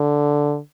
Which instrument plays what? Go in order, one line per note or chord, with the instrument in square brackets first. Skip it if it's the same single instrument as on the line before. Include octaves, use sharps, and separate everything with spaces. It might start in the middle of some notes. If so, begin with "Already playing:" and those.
Already playing: [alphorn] D3